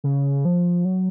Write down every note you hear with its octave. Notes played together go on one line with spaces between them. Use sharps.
C#3
F3
F#3